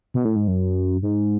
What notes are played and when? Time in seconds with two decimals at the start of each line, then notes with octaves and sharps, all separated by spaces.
0.14 B2
0.25 A2
0.36 G#2
0.48 F#2
1.02 G#2